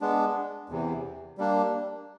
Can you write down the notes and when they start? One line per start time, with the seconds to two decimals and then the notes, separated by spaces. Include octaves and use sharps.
0.01 G#3 B3 D4
0.70 E2 C3 E3
1.38 G3 A#3 D4